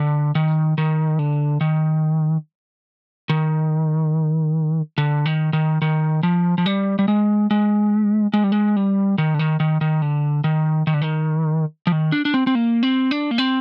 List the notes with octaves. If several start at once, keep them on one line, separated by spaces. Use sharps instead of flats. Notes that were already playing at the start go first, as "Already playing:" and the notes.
Already playing: D3
D#3
D#3
D3
D#3
D#3
D3
D#3
D#3
D#3
F3
F3
G3
G3
G#3
G#3
G#3
G3
G#3
G3
D#3
D3
D#3
D#3
D#3
D3
D#3
D#3
D3
D#3
F3
D#3
D4
D4
C4
C4
A#3
C4
D4
A#3
C4